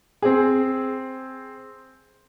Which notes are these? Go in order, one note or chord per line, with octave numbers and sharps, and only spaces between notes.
C4 G#4